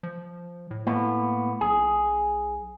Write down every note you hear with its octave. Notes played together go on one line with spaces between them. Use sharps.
F3
A2
A2 A#3 B3
B1 G#4